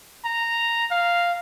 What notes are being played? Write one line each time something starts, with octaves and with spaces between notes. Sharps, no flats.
A#5
F5